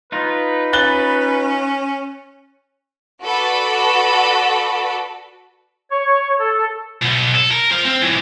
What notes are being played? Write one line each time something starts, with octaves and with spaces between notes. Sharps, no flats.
D#4 F4 B4
C#4 F#6 A6 G7
F#4 A4 B4 D5
C#5
A4
B2 F#3
A4
A#4
C5 F5
C4
E3 F#3